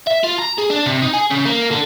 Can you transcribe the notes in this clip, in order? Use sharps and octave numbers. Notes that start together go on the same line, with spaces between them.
E5
F4
A#5
G#4
D4
C3
D#4
G#4
C#3
A#3
D3